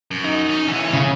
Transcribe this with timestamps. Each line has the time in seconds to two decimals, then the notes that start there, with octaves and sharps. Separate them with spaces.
0.11 F#2
0.24 D#4
0.50 C#4
0.68 D2 E3
0.93 C#3